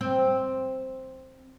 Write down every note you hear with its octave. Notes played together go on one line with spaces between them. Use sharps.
C4